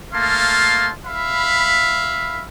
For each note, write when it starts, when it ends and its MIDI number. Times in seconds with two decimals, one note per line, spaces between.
0.13 0.90 57
0.13 0.90 58
0.13 0.90 77
0.13 0.90 81
0.13 0.90 84
1.06 2.45 76
1.06 2.45 77
1.06 2.45 83